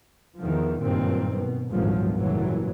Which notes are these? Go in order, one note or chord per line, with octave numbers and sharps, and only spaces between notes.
E2 D#3 F3
F#1 G2 A#2 D#3 C4
B2
G#1 D2 G2 A#2 F3 F#3
F#1 G2 A#2 E3 F#3